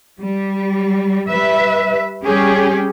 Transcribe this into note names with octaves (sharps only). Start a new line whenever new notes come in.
G3
G3 B4 E5
G3 C#4 G4 G#4